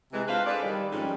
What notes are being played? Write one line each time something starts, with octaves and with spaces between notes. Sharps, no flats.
C3 E3 G#3
C4 D4 F4 B4 C5 F5
G#4 A4 B4 D5
D#3 G3
F2 G#2 D#3 G3 C#4 D#4